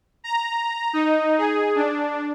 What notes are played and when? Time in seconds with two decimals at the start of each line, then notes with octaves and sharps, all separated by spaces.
0.24 A#5
0.93 D#4
1.38 G#4
1.76 D4